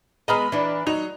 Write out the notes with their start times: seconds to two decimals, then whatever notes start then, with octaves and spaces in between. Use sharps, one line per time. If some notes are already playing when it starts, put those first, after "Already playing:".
0.28 G#3 B3 D#5 A#5 B5 F6
0.52 E3 D4
0.87 F#3 D#4 F7